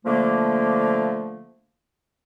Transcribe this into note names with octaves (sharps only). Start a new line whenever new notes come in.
D3 F3 A3 A#3